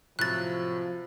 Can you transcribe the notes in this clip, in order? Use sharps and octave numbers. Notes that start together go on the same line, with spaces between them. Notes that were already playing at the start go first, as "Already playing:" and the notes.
A2 C3 F3 F#3 F#6 A6